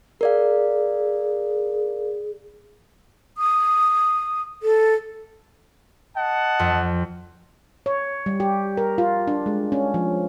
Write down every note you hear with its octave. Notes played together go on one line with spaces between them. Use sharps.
G#4 A#4 D5 F5
D#6
A4
D#5 F#5 A5
F2
C#5
G3
G4
A#4
F4
D4
G#3
C#4
F3